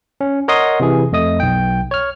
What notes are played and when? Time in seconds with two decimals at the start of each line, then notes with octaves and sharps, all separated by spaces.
0.21 C#4
0.48 A#4 C#5 D#5 F#5 C6 D#6
0.80 C3 E3 G#4
1.12 F2 A3 D#5 D#6
1.40 B1 G5
1.91 C#5 F6